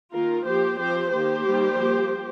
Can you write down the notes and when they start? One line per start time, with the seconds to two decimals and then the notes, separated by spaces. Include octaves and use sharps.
0.13 D#3 A#3 F4 A#4
0.46 F3 A#3 G4 C5
0.79 F3 C4 G4 C5
1.13 D#3 A#3 G4 C5
1.47 D#3 G3 A#3
1.79 F3 A#3